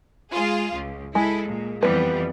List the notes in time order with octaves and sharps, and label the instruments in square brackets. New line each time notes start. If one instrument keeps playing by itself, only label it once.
[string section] G#3 F4 G#4
C#2
[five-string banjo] G#3 [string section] E4 G#4 A4
[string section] A#2
[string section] F2 E3 G3 [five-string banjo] B3 B4